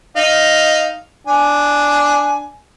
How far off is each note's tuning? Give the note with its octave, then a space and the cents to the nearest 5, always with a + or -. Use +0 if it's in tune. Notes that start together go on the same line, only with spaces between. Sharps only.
D#4 +0 F5 +0
D4 +0 G#5 +15